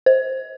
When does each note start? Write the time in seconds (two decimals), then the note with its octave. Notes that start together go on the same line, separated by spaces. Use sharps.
0.06 C5